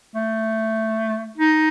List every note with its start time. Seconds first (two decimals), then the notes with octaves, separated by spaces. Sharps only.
0.15 A3
1.38 D#4